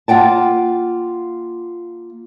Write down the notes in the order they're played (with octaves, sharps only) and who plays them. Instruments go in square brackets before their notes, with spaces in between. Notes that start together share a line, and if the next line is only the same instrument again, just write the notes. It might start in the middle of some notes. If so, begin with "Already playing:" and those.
[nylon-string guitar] A#3 F4 F#5 G5 A5